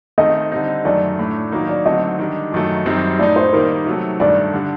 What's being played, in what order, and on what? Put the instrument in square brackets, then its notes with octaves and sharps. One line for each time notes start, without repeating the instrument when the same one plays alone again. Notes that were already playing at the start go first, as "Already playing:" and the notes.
[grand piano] D#3 A3 C4 [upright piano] D#5
[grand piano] D3 G3 C4 D#4
[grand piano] F#2 D#3 A3 [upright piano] D5
[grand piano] A2 A3 D4
D#3 F#3 A#3 D#4
[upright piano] D5
[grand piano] D3 F#3 A3 C4 [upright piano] D#5
[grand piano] D#3 G3 D4
F#2 D#3 F#3 A3
F#2 D#3 G3 C4 D#4
[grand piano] A2 A3 D#4 [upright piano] D5
[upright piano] C5
[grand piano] D#3 G3 A#3 D#4 [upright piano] A#4
[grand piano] C3 F#3 A3
[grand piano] G2 D#3 A3 [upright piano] D5
[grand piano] D3 G3 D4